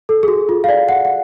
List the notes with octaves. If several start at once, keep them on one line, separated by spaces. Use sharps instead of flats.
A4
G#4
F#4
F4
F5
D5
F#5
F#5